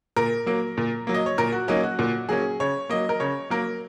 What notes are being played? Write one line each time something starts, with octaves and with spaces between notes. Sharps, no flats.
A#2 A#4
F#3 A#3
A#2
F#3 A#3
D#5
C#5
A#2 A#4
F#4
F#3 A#3 C#4 D#4
F#4
A#2 F#4
F#3 A#3 C#4 G#4
C#3 C#5
F#3 A#3 D#5
A#4
C#3 C#5
F#3 A#3 A#4